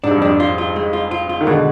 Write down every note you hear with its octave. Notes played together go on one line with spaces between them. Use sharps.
G#2 D4
G2
F2
G2 D4
F4
F4
G#3
F4
F4
F4
D#3
B2 D3 G#3